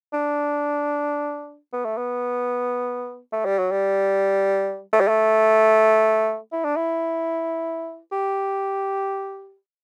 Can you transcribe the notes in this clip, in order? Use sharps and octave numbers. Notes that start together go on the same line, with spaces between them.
D4
B3
A3
B3
A3
G3
F#3
G3
A3
G3
A3
E4
D4
E4
G4